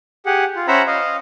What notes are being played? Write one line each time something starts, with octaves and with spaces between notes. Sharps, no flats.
G4 G#4 F#5
F4
C#4 C5 E5 F#5 A#5 B5
D#5 F5